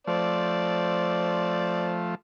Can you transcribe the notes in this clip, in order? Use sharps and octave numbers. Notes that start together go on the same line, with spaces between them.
F3 A3 C4 D5